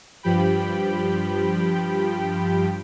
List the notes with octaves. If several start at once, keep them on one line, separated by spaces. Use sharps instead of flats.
G2 F3 G4 G5 B5